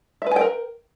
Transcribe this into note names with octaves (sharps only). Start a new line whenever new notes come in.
A#4 B4 E5 G5 G#5